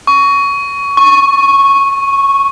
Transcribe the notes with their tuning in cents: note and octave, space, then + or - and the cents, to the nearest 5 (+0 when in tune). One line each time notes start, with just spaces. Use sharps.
C#6 +20
C#6 -10